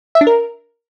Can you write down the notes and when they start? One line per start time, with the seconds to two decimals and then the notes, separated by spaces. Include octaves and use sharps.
0.15 E5
0.21 D4
0.27 A#4